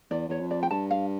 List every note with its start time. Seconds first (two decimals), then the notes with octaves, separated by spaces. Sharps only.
0.11 E2 D5
0.29 E2 C#5
0.40 F2
0.51 D5
0.63 G5
0.71 G2 A5
0.91 F5